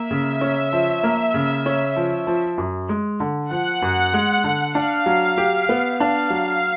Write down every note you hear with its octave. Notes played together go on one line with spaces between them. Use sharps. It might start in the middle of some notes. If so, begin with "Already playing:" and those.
Already playing: A#3 E5
C#3
C#4
F3
A#3
C#3
C#4
F3
F3
F#2
G#3
D3
F3 F#5
F#2
G#3
D3
D4 F5
F#3
G4
B3
D4 F5
F#3